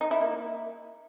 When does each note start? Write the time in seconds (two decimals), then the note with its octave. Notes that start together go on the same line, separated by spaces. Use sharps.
0.01 D#4
0.11 E4
0.21 A#3